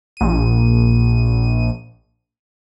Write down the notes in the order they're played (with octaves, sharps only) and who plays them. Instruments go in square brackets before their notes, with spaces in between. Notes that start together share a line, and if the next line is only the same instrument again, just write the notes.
[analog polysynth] A#1 D#7